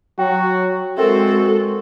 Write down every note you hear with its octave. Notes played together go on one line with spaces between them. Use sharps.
F#3 F#4 G5
G#3 C4 F#4 A4 A#4 E5